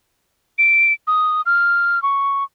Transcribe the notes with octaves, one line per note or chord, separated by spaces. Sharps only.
D7
D#6
F6
C#6